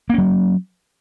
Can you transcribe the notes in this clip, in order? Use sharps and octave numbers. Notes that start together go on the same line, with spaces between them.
F#3 A#3 C#4